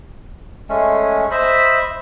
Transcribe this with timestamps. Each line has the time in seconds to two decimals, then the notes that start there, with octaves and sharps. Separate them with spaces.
0.69 G#3 A3 C#4
1.31 C5 D#5 E5 B5